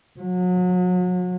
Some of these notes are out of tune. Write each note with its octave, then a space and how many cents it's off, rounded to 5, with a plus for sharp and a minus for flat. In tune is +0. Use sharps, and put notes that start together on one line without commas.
F#3 -35